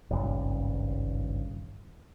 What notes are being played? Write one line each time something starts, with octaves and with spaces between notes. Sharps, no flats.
D#1 G#1 G2 C#3